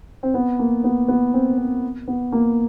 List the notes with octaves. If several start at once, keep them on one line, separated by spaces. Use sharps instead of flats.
C4
B3
A#3
B3
B3
C4
C4
B3
A#3